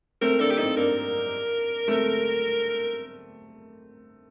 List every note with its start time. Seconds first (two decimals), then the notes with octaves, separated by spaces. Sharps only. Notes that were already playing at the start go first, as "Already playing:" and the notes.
0.21 A3 C4 A#4
0.40 A#3 D4 A4
0.51 G4
0.58 C4 D#4 A4
0.77 A#3 D4 A#4
1.88 A3 C4